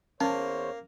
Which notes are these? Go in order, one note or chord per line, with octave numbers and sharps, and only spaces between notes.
E2 A#3 C#4 C5 C#5